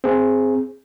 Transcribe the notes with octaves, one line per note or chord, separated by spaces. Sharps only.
C4 G#4